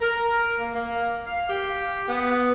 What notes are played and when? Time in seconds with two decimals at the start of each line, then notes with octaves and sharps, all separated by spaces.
0.02 A#4
0.60 A#3
0.75 A#3
1.27 F5
1.49 G4
2.08 B3